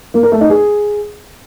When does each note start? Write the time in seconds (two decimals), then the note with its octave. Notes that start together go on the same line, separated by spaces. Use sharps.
0.14 A#3
0.23 A#4
0.32 A3
0.41 D#4
0.50 G#4